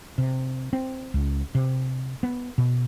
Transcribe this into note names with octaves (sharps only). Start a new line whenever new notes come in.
C3
C4
C#2
C3
B3
B2